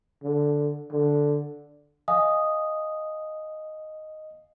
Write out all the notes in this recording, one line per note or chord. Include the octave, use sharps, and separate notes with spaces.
D3
D3
D#5 F5 G#5 D#6